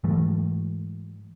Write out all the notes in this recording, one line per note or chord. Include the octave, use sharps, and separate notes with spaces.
G#2 E3 F#3 A3